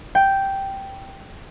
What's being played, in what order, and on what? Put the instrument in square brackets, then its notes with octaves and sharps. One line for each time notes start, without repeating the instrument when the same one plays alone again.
[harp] G5